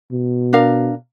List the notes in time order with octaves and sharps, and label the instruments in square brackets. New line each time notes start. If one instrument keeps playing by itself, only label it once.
[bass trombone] B2
[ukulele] D4 A#4 F5